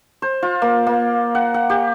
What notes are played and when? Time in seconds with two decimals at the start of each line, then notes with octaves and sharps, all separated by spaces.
0.22 C5
0.42 F4
0.62 A#3
0.87 A#3
1.35 F#5
1.54 F#5
1.70 G4